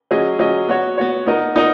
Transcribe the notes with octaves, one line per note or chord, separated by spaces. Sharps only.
F#3 C#4 G#4 D#5
F#3 C#4 G#4 D#5
B3 F#4 C#5
B3 F#4 C#5
B3 D#4 A#4 D#5
B3 D#4 A#4 D#5